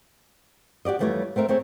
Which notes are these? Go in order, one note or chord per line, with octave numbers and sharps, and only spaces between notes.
F#4 G4 D5 D#5
F2 E3 G3 A3 B4 C#5
A3 C4 A#4 E5
A3 C4 G#4 C#5